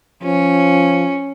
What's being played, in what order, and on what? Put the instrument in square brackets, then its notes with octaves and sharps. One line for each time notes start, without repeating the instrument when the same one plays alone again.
[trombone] F3 [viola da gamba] C#4